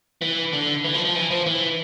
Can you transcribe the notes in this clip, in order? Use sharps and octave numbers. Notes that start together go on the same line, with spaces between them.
E3
D3
E3
F3
F3
E3
F3
E3